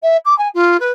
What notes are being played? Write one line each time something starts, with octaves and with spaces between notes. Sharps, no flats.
E5
D6
G#5
F4
B4